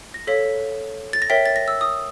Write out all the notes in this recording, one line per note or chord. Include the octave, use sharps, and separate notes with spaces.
A#6
A4 C#5 F5 B6
A6
A#6
A#4 C#5 E5 G5 B6
A6
A#6
E6
D#6